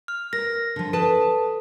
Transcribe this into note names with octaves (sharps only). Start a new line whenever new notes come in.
F6
A#4 A#6
D3 F3
A4 B4 A5